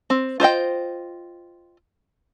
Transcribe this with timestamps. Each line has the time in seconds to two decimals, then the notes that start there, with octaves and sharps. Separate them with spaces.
0.10 C4
0.40 F4 C5 D#5 G5